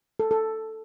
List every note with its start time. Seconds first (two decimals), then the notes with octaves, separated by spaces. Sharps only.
0.20 A4
0.31 A4